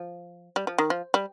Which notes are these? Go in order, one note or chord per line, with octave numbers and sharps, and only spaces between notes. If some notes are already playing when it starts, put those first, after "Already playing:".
Already playing: F3
G3
F3
D#3
F3
G3